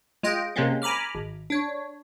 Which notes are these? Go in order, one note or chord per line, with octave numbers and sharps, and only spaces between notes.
G#3 F4 D#5 G5
C3 G#3 A#3 C4 C#4
G#5 A#5 B5 D6 F6
G#1
D4 C#5